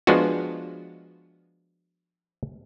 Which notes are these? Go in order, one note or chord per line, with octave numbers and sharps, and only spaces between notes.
F3 G#3 B3 D4 F4 F#4